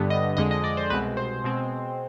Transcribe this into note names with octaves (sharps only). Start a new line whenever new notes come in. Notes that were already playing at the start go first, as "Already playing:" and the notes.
Already playing: G2 D3 G3 B3
D#5
F2 D3 G#3 D#5
D#5
D5
C5
C2 B2 G#3 C4 B4
C5
B2 G#3 C4